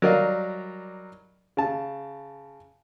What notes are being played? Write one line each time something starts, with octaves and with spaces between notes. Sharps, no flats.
F#3 G3 A#4 D5 D#5 F5
C#3 A5